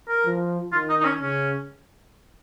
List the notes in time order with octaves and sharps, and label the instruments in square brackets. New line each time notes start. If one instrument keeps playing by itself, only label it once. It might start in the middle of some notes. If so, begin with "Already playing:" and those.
[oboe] A#4
[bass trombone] F3
[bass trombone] D#3 [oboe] F4
[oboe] D#4
D#4
C#4
[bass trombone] C#3 [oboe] C#4